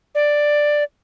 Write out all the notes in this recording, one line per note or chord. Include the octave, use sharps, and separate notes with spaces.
D5